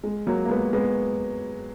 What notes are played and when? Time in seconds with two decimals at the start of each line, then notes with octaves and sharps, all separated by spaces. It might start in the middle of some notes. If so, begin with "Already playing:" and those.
0.03 G#3
0.27 F#3 A#3
0.45 A#3
0.50 G#3 B3
0.73 G#3 B3